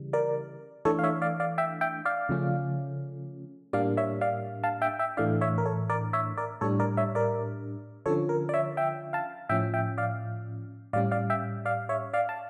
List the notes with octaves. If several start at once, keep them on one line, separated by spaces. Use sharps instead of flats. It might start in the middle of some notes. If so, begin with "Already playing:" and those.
Already playing: C#3 E3 G3
A#4 D5
E3 A3 D4 A4 C#5
F5
C#5 E5
D5 F5
D5 F5
E5 G5
E5 G5
D5 F5
C#3 F3 A3 C#4
A2 G3 A#3 D4 D5 F5
C#5 E5
D5 F5
F5 A5
E5 G5
E5 G5
A2 E3 A3 D4 D5 F5
C#5 E5
A#4
A4 C#5
A#4 D5
C#5 E5
A#4 D5
A2 G3 D4 A4 C#5
A#4 D5
C#5 E5
A#4 D5
D3 F3 C#4 A4 C#5
A#4
D5
C#5 E5
E5 G5
F5 A5
A2 F3 C#4 E5 G5
E5 G5
D5 F5
A2 G3 C#4 D5 F5
D5 F5
E5 G5
D5 F5
C#5 E5
D5 F5
A5